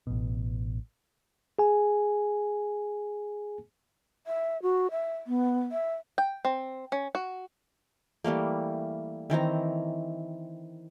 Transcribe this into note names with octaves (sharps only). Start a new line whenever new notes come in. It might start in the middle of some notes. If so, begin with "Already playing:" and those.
A1 B2
G#4 G#5
E5
F#4
E5
B3
E5
G5
C4
C#4
F#4
E3 G3 A3 A#3
D#3 E3 C4 A#5